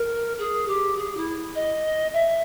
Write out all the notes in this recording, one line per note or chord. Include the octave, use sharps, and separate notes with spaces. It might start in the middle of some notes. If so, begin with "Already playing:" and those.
Already playing: A#4
G#4
G4
G#4
E4
D#5
E5